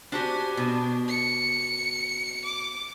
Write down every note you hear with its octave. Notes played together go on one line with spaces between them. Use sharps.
D4 F#4 G4 C5 G#5
B2 D4
C#7
D6